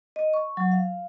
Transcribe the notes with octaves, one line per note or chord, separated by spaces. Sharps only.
D#5
C#6
F#3
F5